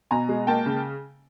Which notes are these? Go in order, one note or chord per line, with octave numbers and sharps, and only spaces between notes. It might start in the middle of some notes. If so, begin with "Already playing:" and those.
B2 G#5 A#5
G#3
A#3 G5 A5
C#3